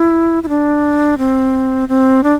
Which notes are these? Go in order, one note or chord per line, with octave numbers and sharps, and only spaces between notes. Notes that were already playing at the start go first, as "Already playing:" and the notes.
Already playing: E4
E4
D4
C4
C4
D4